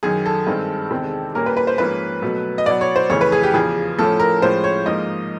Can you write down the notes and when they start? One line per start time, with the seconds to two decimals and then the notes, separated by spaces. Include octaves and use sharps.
0.03 F#2 D#3 F#3 G#4
0.26 A4
0.47 G2 D#3 G#3 C4
0.91 E2 C3 D#3 G#3 C4
1.35 A#2 G3 A#3 C#4 A#4
1.46 B4
1.57 B4
1.67 C5
1.78 G#2 F3 A#3 C#4 B4
2.22 B2 F#3 A3
2.58 D#5
2.66 B2 F#3 B3 D5
2.81 C#5
2.96 C5
3.10 F2 C#3 E3 A3 C#5
3.21 B4
3.32 G#4
3.43 G4
3.54 E2 C#3 F3 G#4
3.99 A2 F3 A3 C#4 A4
4.20 A#4
4.42 A2 F3 G#3 C#4 C5
4.64 C#5
4.86 G#2 F3 A#3 D#5